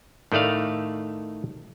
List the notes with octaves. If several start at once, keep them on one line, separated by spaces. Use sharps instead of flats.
A2 D#3 A3 D5 F5